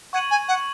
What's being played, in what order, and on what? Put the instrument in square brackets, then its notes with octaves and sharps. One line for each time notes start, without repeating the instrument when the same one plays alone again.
[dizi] F#5 [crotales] C#6 G#6 D#7 F#7
[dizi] G#5
F#5